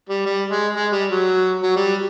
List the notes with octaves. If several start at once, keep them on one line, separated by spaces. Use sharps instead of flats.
G3
G3
G#3
G#3
G3
F#3
F#3
G3